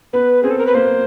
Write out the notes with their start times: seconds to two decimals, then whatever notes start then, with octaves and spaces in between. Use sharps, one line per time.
0.13 B3 B4
0.43 C4 G#4
0.51 A4
0.59 A#4
0.66 B4
0.74 A#3 C5